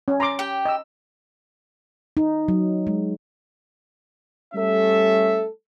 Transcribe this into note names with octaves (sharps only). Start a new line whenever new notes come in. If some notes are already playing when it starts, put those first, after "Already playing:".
C#4
A#5 C6 D6
G4 G5
D#5 E6
D#4
F#3
G#3
G3 A3 C#4 A4 E5